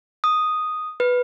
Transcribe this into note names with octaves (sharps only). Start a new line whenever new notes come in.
D#6
B4